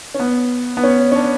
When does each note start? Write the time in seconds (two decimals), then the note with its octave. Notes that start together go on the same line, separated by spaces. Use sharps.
0.14 C#4
0.20 B3
0.77 B3
0.84 C#4
1.12 C#4
1.15 D4